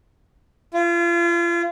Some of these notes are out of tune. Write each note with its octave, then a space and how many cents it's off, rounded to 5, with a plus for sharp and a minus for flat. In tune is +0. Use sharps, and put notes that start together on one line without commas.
F4 -35